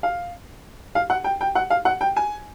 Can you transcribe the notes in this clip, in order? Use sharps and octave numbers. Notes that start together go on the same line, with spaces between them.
F5
F5
F#5
G5
G5
F#5
F5
F#5
G5
G#5